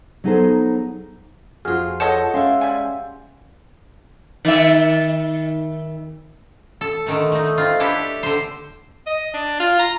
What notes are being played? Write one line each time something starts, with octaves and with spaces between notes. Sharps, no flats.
F#3 B3 D#4 G#4 A4 C5
F2 F4 F#4 G#4 F6
A4 C#5 D#5 F#5 G6 E7
G#3 C#4 D5 E5 F5 C6
G3 G#5
D#3 E5
A4
D3 D#3 A3
A3 D#4
C4 F4
D4 E4 G4 A4 B4
D3 C5
D#5
D4
F4
A#5